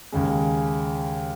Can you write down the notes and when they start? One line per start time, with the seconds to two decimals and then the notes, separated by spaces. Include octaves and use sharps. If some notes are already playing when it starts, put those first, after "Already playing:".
0.12 D#2 C#3 G#3